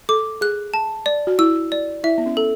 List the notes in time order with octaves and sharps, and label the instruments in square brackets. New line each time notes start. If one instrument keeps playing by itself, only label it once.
[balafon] A4 [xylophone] D6
[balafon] G#4 [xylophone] F#6
[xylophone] A5
D5
[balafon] F#4
[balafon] E4 [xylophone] E6
[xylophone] D5
[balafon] E4 [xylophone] E5
[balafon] B3
C#4
[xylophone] A4